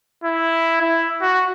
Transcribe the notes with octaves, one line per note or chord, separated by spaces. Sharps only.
E4
E4
F#4